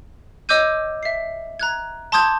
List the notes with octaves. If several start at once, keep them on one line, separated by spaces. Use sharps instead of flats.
C#5 D#5 D6 E6 G6 D#7
E5 C7
A#5 F#6 G#6
A5 C6 D6 D#6 G6 G#6